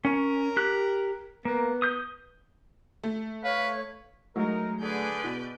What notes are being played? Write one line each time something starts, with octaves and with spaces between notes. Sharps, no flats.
C#4 A#4
G4 F#6
A#3 B3
D#6 G6
A3
B4 C#5 F5
F#3 G#3 A3 D#4 A#4
D3 G#4 B4 D5 G6
B2